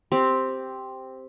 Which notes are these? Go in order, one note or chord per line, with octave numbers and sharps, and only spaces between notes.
C4 G4